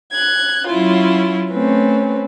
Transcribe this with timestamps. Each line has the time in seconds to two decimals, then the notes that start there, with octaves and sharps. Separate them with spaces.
0.12 F#6 G#6
0.68 F#3 C#4 E4 F4
1.51 A3 C4 C#4 B4